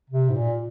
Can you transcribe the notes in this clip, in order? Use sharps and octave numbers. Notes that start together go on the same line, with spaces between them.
C3
G#2
A#2